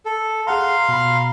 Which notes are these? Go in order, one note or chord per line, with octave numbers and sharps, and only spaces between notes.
A4
G#4 F5 F#5 A#5 C6
B2 A#5 B5